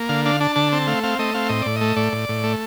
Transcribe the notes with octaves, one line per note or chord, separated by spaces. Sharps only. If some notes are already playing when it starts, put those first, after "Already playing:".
Already playing: A#3
D3 F5
D4 F5
D4 A5
D3 A5
C4 A5
A3 F5
C4 F5
A3 D#5
C4 F5
A2 D#5
A2 D5
D#5
A3
A2 D5
A2
A2
A3